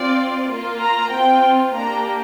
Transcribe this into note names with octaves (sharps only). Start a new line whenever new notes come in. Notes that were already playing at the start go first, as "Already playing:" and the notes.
Already playing: C4 F4 D5
A#3 F4
A#5
C4 F4 G5
A#3 D4 G4 A#5